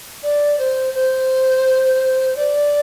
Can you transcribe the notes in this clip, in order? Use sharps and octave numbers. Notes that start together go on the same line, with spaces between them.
D5
C5
C5
D5